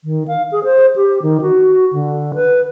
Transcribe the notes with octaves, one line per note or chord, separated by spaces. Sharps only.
D#3
F5
G#4
C5
G4
D#3
F#4
D3
B4